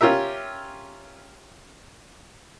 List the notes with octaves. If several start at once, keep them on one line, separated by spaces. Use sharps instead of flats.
C#4 F4 G4 A#4 E5